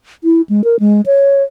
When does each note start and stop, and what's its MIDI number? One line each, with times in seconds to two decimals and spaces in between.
0.24 0.41 64
0.49 0.64 56
0.64 0.76 70
0.80 1.01 56
1.06 1.43 73